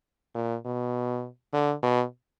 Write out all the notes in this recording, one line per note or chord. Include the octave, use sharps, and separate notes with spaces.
A#2
B2
D3
B2